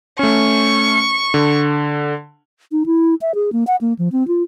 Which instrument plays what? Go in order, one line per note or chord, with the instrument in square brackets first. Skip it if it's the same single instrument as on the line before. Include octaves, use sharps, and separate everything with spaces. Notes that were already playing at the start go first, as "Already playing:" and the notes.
[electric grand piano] A3 C#4 [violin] C#6
[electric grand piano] D3
[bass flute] D#4
E4
E5
G#4
A#3
F#5
A#3
F3
C4
F4